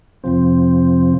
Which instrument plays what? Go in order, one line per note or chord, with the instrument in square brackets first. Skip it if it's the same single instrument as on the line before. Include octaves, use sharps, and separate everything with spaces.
[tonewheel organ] F2 C3 F3 C4